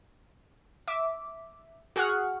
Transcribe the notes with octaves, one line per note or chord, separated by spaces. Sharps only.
E5 D6
F#4 G#4 F#5 C#6 F6